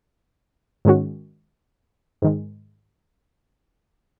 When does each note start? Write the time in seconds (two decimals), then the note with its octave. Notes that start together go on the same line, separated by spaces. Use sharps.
0.85 G#2 D#3 G#3 C#4 F#4
2.22 G#2 D#3 G#3